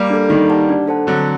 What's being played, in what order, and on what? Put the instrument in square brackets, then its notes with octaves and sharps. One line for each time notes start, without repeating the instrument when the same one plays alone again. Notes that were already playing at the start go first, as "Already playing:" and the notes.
Already playing: [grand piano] G3 A#3
[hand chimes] D4 A4
[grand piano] D#3 G3 [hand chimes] D#4
[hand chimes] G4 D5 F#5 A5
D4
A4 C5 F#5 A5
[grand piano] D3 F#3 [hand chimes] C4